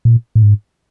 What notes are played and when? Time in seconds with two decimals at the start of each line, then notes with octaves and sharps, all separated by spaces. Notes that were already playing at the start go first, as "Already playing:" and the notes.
0.05 A#2
0.35 A2
0.43 G#2